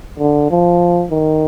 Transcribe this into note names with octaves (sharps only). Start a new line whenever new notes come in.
D3
F3
D#3